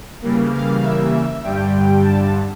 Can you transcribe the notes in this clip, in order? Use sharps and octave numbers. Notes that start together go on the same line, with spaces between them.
C#3 E3 G3 A#3
F5
E5
G2 D3 G3 G5
A5